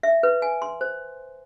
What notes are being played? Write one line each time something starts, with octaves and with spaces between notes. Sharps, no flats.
E5
B4
G#5
C6
C5